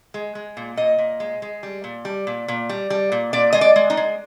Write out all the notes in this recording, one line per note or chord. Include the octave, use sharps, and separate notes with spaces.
G#3
G#3
A#2
A#2 D#5
A#2
G#3
G#3
G3
A#2
G3
A#2
A#2
G3
G3
A#2
A#2 D5
G#3 D#5
D5
G#3
D#4
G#3